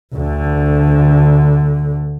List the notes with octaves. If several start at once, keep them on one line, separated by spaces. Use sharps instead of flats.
D2 D3